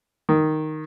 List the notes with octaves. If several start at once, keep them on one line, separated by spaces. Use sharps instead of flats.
D#3